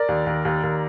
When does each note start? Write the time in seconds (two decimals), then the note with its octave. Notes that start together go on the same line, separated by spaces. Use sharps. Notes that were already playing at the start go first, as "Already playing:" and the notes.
Already playing: A#4 D5
0.08 D#2
0.26 D#2
0.45 D#2
0.63 D#2